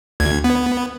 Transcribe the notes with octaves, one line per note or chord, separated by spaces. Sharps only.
D2 G#6
B3